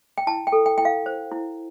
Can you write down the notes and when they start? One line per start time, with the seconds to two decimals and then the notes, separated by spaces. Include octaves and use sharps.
0.18 G5
0.27 E4 A5
0.47 G5
0.52 A4
0.66 G5
0.78 E4 G5
0.85 F5
1.06 C5
1.31 E4